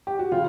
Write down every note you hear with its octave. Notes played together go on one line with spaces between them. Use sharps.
G4
F#4
C#3 F4